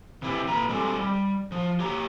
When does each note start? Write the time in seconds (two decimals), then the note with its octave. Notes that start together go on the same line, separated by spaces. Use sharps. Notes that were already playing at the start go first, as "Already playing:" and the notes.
0.22 C3 E3 E4 G4
0.48 A#2 B4 A#5
0.69 G3 G#3 C4 G4 A4
0.96 G3
1.52 F3
1.80 G4 C#5 A#5